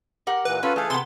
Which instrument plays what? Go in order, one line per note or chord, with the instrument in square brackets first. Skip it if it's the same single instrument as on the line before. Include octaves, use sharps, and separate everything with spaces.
[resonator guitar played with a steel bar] G4 A#4 F#5
[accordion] A#2 E3 [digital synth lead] B4
[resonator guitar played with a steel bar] C#4 [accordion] F4 A4 B5
[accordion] E3 G#4 A4 [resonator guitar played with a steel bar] A3 F5
[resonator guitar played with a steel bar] C3 B3 [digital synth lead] C6